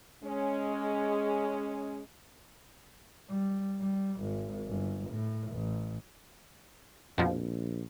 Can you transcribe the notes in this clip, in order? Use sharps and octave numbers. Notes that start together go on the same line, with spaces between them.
G#3 C#4
G3
G3
G#1
G1
A2
A1
A#1 F2 B2 F3